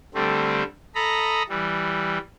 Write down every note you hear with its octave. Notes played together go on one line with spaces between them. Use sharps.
D3 G3 A3 C4
A4 D#5 A#5 B5
E3 G3